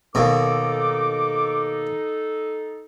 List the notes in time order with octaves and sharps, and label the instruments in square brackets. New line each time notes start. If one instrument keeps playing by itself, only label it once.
[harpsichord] D#2 B2 [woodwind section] D#4 A4 [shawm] D6